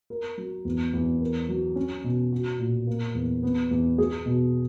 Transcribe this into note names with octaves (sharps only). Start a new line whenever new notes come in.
A#4
F#3
E2
E2
A#4
F#3
C#4
B2
F#4
A#2
A#3
E2
B3
E2
G#4
B2